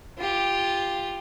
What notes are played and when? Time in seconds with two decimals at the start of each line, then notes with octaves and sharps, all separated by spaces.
0.18 F4 G4